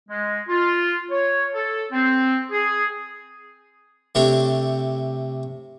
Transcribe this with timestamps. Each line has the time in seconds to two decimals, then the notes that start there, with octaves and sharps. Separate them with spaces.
0.09 G#3
0.48 F4
1.11 C#5
1.54 A4
1.92 C4
2.51 G#4
4.15 C3 A3 D4 C5 C#5